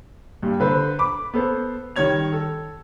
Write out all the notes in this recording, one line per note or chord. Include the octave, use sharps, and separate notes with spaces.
G2 A#2 G3
D3 B4 C5
B5 D6
B3 A4 C5
D#3 G3 C#5 G#6 F7
A4